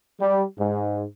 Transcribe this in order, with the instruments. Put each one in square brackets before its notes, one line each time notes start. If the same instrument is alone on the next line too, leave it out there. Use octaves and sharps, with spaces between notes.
[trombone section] G3
G#2